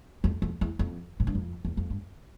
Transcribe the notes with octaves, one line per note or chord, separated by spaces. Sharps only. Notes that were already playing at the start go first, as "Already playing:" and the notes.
F2
F2
E2
F2
A2
G2
F2
E2
F2
G2